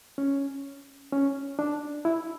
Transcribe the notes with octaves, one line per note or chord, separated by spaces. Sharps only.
C#4
C#4
D4
E4